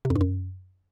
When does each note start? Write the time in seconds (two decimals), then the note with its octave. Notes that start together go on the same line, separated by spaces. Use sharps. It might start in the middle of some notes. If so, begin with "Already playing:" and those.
0.05 C3
0.10 F2
0.16 G2
0.21 F#2